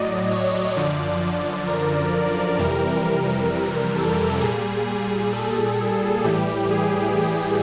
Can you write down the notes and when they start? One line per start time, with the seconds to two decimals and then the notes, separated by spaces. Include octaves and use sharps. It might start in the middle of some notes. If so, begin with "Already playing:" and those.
Already playing: A2 F#3 D5 D#5
0.30 C#5
0.76 F#2 D3 F3 D5
1.67 A#4
2.59 F2 C3 E3 G3
3.05 A#4
3.96 A4
4.41 A#2 G3 G#4
4.87 G#4
5.33 A4
6.24 A2 E3 G3 G4
6.71 G#4
7.16 G4